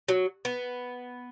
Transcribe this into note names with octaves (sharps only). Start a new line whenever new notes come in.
F#3
B3